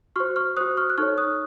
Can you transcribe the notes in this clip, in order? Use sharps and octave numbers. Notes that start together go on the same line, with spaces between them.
F#4 C5 C#6 F6
C#6 F6
F#4 C5 D#6 F#6
C#6 F6
F#6
D#4 A4 C#5 C#6 F6
D#6 F#6